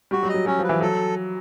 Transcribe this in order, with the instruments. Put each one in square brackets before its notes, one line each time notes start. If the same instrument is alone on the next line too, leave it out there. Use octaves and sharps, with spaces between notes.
[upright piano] G3 [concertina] F#4
[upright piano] F#3
[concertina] D#5
[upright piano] F#3
[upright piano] F#3 [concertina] C#4
[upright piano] F3
[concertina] B4
[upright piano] E3
[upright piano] F#3 [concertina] A4